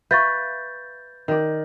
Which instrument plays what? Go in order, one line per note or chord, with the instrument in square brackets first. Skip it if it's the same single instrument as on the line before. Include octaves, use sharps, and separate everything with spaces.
[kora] B4 [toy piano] E5 F5 C#6 [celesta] G6 A6
[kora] D#3 D5